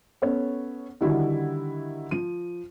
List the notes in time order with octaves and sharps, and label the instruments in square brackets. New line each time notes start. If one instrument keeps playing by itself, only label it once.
[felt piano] B3 C#4 A4 C#5
D3 D#3 G3 E4 F#4
F3 D#7